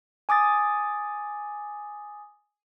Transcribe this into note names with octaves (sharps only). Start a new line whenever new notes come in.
G#5 D6 D#6 A6